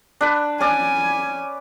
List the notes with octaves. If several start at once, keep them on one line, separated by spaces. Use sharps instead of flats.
D4 B4
C#4 D5 G#5